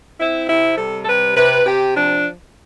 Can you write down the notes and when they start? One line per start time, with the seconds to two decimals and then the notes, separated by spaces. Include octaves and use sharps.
0.20 C4 E4
0.49 C3 E4
0.77 G3 A4
1.03 A4
1.07 C3 B4
1.36 C3 B4
1.66 C3 G4
1.95 F3 D4